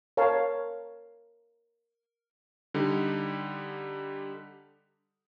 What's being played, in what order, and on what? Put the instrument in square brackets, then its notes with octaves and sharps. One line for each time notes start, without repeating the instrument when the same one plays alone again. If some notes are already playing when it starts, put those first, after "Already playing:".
[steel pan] A#4 C#5 F5 A5
[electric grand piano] D3 G3 D#4